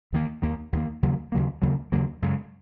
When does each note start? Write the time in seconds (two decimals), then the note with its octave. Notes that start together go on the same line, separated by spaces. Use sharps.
0.13 D#2 D#3 A#3
0.42 D#2 D#3 A#3
0.73 D#2 D#3 A#3
1.03 D#2 C#3 F#3 A#3
1.32 D#2 C#3 F#3 A#3
1.62 D#2 C#3 F#3 A#3
1.92 D#2 C#3 F#3 A#3
2.22 F#2 C#3 G#3